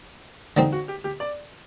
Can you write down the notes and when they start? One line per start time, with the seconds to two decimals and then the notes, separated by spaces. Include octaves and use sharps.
0.57 D3 G3 C4 D#4
0.72 F#4
0.88 G4
1.04 G4
1.20 D5